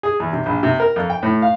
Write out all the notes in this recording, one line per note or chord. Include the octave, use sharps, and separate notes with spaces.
G#4
E2
C3
A#1
C3
A#4
F2
G5
A2
F5